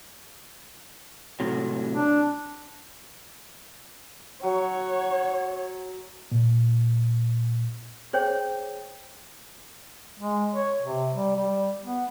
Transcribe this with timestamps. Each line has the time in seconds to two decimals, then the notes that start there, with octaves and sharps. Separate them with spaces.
1.40 A2 C3 F#3
1.92 D4
4.43 F#3 C#5 F#5
6.32 A#2
8.13 G#4 C5 C#5 G5
10.19 G#3
10.54 C#5
10.82 C3
11.14 G3
11.36 G3
11.83 B3